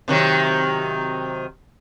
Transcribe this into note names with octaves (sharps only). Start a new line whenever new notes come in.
C3 D#3 F#3